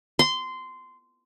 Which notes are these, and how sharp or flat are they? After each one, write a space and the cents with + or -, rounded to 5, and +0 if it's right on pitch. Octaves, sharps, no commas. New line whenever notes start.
C6 -15